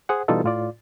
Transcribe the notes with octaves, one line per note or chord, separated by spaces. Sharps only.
G#4 C5 F#5
B2 E3 G3 D#4 F4 A4
A2 F4 D5